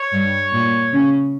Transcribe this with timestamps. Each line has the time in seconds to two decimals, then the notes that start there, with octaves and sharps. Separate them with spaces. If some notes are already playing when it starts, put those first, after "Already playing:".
Already playing: C#5
0.12 G2 G3
0.53 A#2 A#3
0.92 C#3 C#4